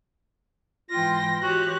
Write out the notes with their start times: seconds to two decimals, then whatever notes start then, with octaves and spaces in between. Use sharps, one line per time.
0.90 G#2 E3 F4 G5 C6 A#6
1.43 E3 F#4 G4 C#5 F#6